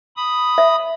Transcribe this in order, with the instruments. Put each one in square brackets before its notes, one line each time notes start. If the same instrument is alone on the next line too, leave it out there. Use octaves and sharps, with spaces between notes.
[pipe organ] B5 D#6
[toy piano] E5